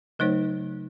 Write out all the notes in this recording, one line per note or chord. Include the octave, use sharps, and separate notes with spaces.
C#3 F#3 A3 D#4 C5 C#5